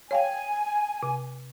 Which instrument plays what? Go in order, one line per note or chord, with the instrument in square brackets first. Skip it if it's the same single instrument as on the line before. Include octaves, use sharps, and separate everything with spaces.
[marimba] C#5 F5 G5 [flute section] G#5
[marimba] C3